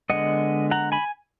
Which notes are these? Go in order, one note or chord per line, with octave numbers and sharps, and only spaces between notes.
D3 G#3 B3 D#5 F#5
F#5 A#5
G#5 B5